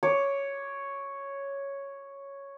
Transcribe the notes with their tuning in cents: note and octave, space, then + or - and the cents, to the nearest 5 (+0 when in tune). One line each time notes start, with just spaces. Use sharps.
C#5 +0 D6 +0